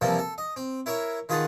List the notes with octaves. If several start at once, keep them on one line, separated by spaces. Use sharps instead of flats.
C3 E3 F3 G3 A#3 A4
A4
D#5
C4
E4 A#4 C#5 E5
D#3 F4 G#4 B4 F#5 A5